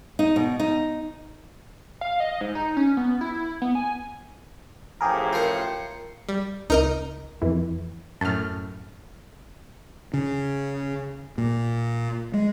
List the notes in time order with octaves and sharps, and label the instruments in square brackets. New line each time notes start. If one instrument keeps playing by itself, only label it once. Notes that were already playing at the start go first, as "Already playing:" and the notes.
[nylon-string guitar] D#4
B2
D#4
[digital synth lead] F5
D#5
G#2
D#4
C#4
B3
E4
B3
G#5
[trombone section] A1 A2 F3 [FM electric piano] G4 G#4 A#4
[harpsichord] F4 A#4 [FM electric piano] G5 C7 C#7
[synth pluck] G3
[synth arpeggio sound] C#2 [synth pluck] D#4 A#4 D#5
[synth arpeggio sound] F2 E3
[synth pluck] F#2 A2 [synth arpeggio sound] A5 F6
[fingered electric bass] C#3
A#2
G#3